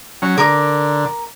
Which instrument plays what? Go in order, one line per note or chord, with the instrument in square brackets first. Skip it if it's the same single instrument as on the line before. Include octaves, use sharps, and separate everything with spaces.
[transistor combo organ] F#3 C#4
[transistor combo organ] D3 [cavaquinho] A#4 D6